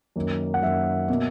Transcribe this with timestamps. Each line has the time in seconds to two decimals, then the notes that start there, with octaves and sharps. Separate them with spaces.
0.16 F#2 D#3 A#3
0.54 F#5
0.62 F#2 D#3 A#3 E5
1.08 B2 A#3